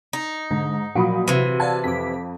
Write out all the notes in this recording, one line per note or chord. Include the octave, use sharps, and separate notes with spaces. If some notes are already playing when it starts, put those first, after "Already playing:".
D#4
G#2 D3
A#2 F3 F#3 F#4 B5 D#6
C3 E3 D#7
D5 F5 F#5 A5 G#6
F2 D6 B6